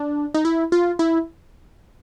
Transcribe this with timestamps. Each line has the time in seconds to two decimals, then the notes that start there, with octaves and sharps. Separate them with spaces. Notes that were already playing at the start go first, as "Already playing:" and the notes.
Already playing: D4
0.34 D#4
0.45 E4
0.72 F4
0.99 E4